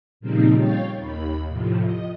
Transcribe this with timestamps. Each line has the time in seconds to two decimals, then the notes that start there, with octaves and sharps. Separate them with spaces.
0.20 A#2 C#3 F3 G3 C4 D#4
0.56 C#5 F5 G5 A6
0.97 D#2 B5
1.49 A2 C3 F3
1.84 D#5